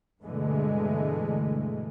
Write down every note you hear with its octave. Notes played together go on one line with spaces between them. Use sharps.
G2 B2 D3 E3 G#3 A3